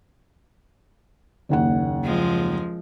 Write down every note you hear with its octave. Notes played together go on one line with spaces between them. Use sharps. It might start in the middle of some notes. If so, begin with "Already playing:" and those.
F#1 D#2 F#5
F3 G#3